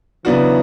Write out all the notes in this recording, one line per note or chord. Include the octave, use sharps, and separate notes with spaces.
C#3 E3 F#3 B3 D4 F#4